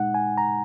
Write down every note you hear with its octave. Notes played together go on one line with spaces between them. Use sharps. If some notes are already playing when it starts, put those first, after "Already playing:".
Already playing: A#2 G#3 D#4 F#5
G#5
A#5